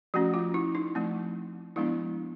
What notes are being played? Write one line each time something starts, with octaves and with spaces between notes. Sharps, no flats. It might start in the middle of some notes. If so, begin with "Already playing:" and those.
F3 A3 C#4 F#4
F4
E4
D#4
F3 A3 C4
F3 G#3 B3 D4 E4